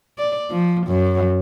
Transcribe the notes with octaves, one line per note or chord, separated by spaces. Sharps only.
D5
F3
F#2